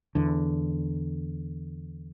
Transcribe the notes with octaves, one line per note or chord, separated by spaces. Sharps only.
E2 D3